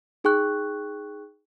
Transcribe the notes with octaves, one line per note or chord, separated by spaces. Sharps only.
D#4 G#4 G5 C#6 F#6